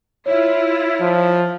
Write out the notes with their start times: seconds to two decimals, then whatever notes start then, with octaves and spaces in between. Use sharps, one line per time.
0.26 E4 F4 C#5 E5
1.01 F3